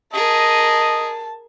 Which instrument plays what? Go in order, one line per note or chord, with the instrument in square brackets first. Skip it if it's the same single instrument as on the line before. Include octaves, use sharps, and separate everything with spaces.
[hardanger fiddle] G#4 A#4 [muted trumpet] D#5 [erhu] A5